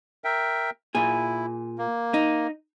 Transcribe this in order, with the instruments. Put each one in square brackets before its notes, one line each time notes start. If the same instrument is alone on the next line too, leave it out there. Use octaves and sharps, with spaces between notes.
[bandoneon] A#4 E5 G5
[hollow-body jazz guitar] A#2 G#4 [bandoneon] E4
[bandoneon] A#3
[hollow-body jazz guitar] D#4